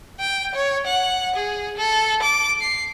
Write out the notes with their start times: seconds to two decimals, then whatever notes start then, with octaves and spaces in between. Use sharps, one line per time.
0.20 G5
0.54 C#5
0.86 F#5
1.35 G#4
1.77 A4
2.22 D6
2.61 C7